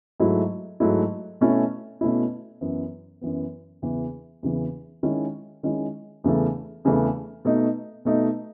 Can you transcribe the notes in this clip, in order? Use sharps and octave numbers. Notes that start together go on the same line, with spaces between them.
G#2 F#3 A3 E4
G#2 F#3 A3 E4
B2 A3 C#4 E4
B2 A3 C#4 E4
F#2 E3 B3
F#2 E3 B3
E2 C#3 E3
E2 C#3 E3
D#3 G#3 C#4 E4
D#3 G#3 C#4 E4
E2 C#3 E3 A3
E2 C#3 E3 A3
B2 A3 D#4
B2 A3 D#4